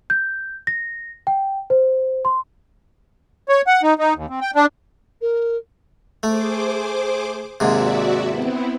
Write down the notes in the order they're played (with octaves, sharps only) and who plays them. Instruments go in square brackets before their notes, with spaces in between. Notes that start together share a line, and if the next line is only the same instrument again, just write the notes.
[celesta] G6
A#6
G5
C5
C6
[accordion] C#5
F#5
D#4
D#4
D#2
C4
G5
D4
[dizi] A#4
[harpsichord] A3 [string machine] G#4 C5 D6
[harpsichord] D#2 G#2 C3 [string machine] F#4 D5 E5
[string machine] B3 C4 E4